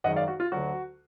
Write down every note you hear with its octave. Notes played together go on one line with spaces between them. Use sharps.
G#1 F#2 D#3 G#3 D#5 F#5
D5 F5
F#4
F4
D2 D3 F#3 F#4